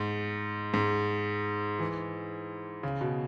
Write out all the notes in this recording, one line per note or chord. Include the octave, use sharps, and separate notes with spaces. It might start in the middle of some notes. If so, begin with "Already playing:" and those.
Already playing: G#2
G#2
E3
C#3
B2